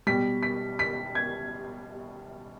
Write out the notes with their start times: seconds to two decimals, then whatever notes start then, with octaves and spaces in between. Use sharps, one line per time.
0.07 B2 G3 B6
0.43 B6
0.79 B6
1.15 G#6